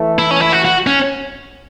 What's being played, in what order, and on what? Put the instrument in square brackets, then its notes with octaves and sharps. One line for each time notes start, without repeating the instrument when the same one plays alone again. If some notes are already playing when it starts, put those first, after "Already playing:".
Already playing: [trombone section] E3 A3
[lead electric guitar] E4
C#4
E4
F#4
F#4
C#4